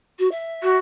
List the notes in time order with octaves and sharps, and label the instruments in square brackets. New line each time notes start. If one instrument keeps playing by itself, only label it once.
[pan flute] F#4
E5
[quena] F#4